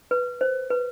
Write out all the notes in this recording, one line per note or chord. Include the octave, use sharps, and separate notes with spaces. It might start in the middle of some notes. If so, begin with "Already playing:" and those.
B4
C5
B4